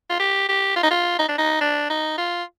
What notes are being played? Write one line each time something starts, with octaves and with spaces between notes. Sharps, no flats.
F4
G4
G4
F4
D#4
F4
D#4
D4
D#4
D4
D#4
F4